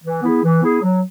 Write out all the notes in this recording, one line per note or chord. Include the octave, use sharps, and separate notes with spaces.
E3
B3 E4 G#4
E3
B3 E4 G#4
F#3